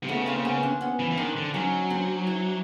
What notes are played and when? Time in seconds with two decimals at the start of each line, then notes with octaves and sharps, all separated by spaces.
0.03 C3
0.09 C#3 A3 B3
0.26 A#3 C4
0.45 B3 C#4
0.63 C4 D4
0.81 B3 C#4
0.99 E3
1.11 E3
1.18 D#3 C4 D4
1.36 D3
1.54 F#3 C#4 D#4
1.90 C4 D4
2.27 D4 E4